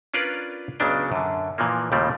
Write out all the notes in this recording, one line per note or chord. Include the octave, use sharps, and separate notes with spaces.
C#4 D4 F4 A#4 B4 D5
C#2 C#3 F#3 B3 D4 G5
F#2 D3
A#2 E3 F3 A#3
D#2 C#3 F3 G3 A3 A#3